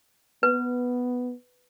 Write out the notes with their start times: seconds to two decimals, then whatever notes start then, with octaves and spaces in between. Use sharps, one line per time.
0.43 B3 B4